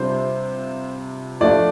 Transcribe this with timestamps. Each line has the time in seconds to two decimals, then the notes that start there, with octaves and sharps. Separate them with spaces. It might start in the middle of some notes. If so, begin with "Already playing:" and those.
Already playing: C3 G3 D4 F4 C5
1.40 F3 A3 D4 F4 D5